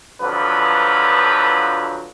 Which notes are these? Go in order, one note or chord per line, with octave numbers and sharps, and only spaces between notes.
F2 D3 F3 F#3 B4